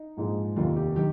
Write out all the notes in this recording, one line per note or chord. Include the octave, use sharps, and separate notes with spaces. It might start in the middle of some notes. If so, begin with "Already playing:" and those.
Already playing: D#4
A#1 G#2 F3 G#3
F1 D#2 D#3 F4
G4
D#3 G4